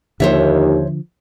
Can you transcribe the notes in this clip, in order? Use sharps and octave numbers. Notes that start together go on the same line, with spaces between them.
D#2 D3 F3 C5 C#5 E5